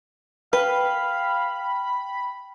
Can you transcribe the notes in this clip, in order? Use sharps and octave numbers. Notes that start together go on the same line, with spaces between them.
B4 F5 G5 B5